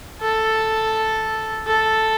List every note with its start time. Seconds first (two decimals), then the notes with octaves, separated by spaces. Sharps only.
0.22 A4
1.67 A4